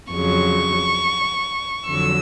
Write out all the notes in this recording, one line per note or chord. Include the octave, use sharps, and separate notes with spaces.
F2 C#3 F#3 C#6
F2 D3 F#3 E6